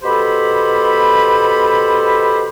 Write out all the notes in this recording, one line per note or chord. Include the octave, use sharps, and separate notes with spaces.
B2 G4 A4 C5 B5